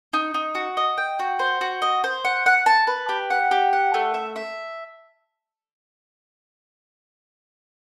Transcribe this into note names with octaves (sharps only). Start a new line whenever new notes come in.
D#4
D#4
F#4
D#5
G5
F#4
C5
F#4
D#5
C5
F#5
F#5
A5
B4
G4
F#5
G4
F#5
A3
E5
E5